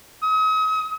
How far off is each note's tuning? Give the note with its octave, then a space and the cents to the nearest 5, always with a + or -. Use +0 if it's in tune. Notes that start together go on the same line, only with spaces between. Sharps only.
D#6 +40